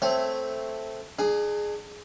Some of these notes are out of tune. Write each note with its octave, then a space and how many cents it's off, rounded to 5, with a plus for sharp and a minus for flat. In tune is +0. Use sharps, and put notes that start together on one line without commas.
A3 +0 C4 +0 C#5 -5
D4 +40 G#4 +5